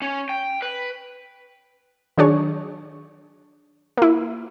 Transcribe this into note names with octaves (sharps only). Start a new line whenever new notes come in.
C#4
G5
B4
D#3 F#3 D4 G#4 C#5
A#3 E4